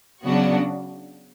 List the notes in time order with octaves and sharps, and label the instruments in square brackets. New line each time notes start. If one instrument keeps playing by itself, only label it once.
[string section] C#3 F#3 B3 D4 F#4